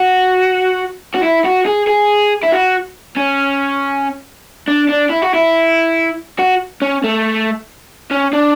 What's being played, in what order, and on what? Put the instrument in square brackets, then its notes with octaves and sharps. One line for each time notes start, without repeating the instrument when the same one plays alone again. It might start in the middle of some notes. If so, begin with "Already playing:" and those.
Already playing: [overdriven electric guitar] F#4
F#4
E4
F#4
G#4
G#4
E4
F#4
C#4
D4
D4
E4
F#4
E4
F#4
C#4
A3
C#4
D4